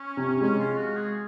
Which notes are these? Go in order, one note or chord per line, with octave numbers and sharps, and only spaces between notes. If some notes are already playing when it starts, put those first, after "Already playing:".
Already playing: C#4
C3
G#3 C#4
F4
F#4
G#4